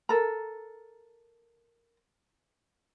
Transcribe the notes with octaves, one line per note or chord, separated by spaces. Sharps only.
A4 A#4 A#5